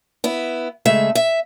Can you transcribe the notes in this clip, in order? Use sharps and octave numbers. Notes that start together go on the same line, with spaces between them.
B3 E4
C#3 G#3 A3 E5
E5